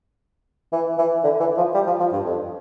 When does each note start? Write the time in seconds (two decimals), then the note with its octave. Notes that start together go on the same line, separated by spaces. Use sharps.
0.72 E3
0.98 E3
1.24 D3
1.40 E3
1.57 F3
1.74 G3
1.87 F3
2.00 F3
2.12 G2
2.25 F2